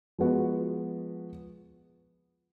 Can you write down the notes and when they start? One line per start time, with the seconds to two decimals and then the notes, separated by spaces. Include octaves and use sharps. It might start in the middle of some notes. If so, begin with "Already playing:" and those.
0.19 F3 G#3 B3 F#4